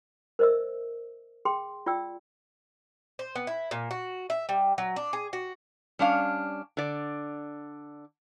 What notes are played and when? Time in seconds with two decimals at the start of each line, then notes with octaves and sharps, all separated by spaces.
0.39 A#4 C5 D#5 E5 E6
1.45 G#4 G5 C6
1.86 F4 D5 G5 E6
3.19 C5
3.35 B3
3.47 E4
3.71 A#2
3.91 F#4
4.30 E5
4.49 G3
4.78 F#3
4.96 D4
5.13 G#4
5.33 F#4
5.99 G3 C#4 D4 F5
6.77 D3 D5